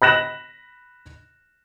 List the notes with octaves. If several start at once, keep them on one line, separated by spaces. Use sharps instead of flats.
B5 F#6 A#6 E7 F#7